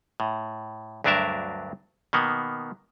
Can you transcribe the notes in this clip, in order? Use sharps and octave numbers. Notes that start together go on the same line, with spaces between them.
A2
D2 G2 F#3 D4 A#4 E5
B2 D#3 A#3 B3